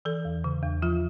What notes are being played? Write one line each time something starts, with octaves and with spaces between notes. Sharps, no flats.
E3 A4
E2
C#3
E2
F3 F4